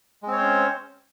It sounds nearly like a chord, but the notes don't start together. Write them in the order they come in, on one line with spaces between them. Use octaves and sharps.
G#3 C4 C#5 C5 C#4